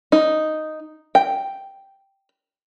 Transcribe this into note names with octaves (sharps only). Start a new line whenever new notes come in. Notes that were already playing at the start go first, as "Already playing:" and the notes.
D#4
G5